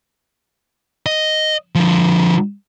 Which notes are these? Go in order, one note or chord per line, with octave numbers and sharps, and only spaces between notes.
D#5
D3 F3